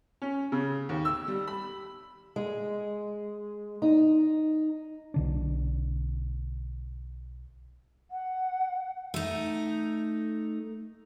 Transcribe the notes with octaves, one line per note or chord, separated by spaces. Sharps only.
C#4
C#3
D#2
E6
G3
B5
G#3
D#4
B1 D3 D4
F#5
A3 D#4